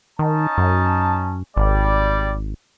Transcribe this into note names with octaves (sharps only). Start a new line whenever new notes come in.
D#3 C#4 D#4 A5
F#2
G#1 G3 D5